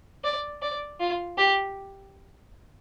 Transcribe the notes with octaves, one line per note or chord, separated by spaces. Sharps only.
D5
D5
F4
G4